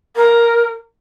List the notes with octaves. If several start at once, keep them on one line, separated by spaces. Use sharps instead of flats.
A#4